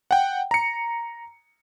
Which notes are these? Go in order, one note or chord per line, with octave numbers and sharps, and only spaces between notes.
F#5 G5
A#5 C#7